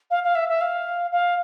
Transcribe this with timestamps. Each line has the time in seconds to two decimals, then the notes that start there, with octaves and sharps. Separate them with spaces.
0.10 F5
0.23 F5
0.35 E5
0.49 E5
0.61 F5
1.11 F5